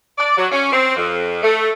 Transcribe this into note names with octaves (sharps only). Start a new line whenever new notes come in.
D5
F#3
C#4
C4
F2
A3